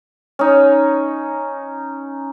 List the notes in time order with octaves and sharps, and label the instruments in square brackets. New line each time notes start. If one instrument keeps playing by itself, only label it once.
[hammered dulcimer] C#4 D#4